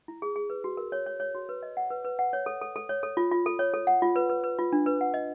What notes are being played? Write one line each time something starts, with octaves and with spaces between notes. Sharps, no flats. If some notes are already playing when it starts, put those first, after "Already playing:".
E4
G#4
G#4
B4
F#4
A#4
C#5
C#5
C#5
F#4
B4
D#5
F#5
B4
B4
F#5
C#5
A4
A4
A4
C#5
A4
F4
F4
A4
C#5
A4
F#5
F4
B4
B4
B4
F4
D4
B4
F#5
D#5